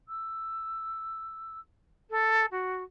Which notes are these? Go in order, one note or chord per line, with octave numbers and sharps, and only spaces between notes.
E6
A4
F#4